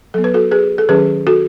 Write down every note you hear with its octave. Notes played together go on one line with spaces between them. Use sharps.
F#3 B3 A4
B4
F#4 A4
G#4 B4
A4
D#3 F#3 C#4 G#4 B4
F#4 A4